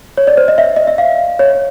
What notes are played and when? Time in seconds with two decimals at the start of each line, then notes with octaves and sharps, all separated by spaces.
0.17 C#5
0.27 D5
0.37 C5
0.48 D#5
0.58 E5
0.76 D#5
0.87 E5
0.98 F5
1.39 C#5